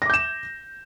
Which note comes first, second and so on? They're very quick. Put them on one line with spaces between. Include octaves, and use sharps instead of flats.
A#6 D6 G6 E7